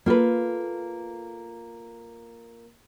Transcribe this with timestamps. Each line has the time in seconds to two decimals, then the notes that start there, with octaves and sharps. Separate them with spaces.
0.06 A#3 F4 A4 B4